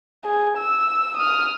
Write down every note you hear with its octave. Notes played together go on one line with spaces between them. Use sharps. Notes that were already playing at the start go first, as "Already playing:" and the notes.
G#4
E6
D#6 F6